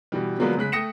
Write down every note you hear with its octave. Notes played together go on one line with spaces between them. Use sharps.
B2 E3 G3
D3 F3 F#3 G#3 A#3 B3
C#3 G#3 F#6 B6
A3 G5 D#6 A#6 C#7 E7